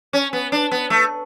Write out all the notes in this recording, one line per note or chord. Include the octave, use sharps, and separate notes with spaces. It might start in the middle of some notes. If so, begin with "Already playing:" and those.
C#4
B3
D4
B3
A3